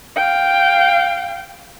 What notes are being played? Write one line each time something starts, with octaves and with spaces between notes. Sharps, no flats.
F5 G5